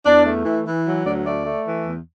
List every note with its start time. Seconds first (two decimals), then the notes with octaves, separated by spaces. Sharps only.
0.06 E2 D4
0.25 A3
0.45 E3
0.66 E3
0.86 F#3
1.05 D2 D5
1.25 A3 D5
1.45 A3
1.65 E3
1.86 E2